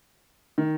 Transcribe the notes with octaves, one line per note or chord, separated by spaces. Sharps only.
D#3